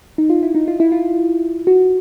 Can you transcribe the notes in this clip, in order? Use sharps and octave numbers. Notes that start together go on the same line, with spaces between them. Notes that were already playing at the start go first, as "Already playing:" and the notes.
D#4
F4
E4
D#4
F4
E4
F4
F#4